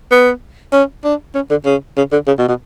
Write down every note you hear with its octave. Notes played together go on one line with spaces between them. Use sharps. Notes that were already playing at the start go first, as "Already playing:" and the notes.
B3
C#4
D4
C#4
D3
C#3
C#3
D3
C#3
B2
B2